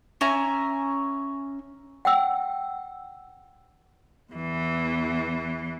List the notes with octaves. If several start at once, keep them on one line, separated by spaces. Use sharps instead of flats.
C#4 E5 G#5 A#5
F#5 G5 E6
E2 E3